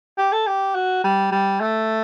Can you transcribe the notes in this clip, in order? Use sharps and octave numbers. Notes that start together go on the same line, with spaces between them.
G4
A4
G4
F#4
G3
G3
A3